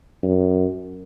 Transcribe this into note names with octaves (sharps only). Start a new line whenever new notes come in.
F#2